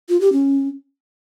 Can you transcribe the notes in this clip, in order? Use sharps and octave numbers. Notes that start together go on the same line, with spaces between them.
F4
G4
C#4